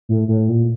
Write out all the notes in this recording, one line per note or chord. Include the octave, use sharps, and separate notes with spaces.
A2
A2
A#2